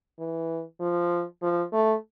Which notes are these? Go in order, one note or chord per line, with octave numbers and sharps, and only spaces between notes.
E3
F3
F3
A3